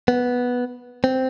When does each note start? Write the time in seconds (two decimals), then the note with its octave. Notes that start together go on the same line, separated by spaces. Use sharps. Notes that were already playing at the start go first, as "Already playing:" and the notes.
0.08 B3
1.04 C4